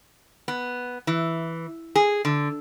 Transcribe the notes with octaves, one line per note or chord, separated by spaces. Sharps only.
B3
E3
G#4
D3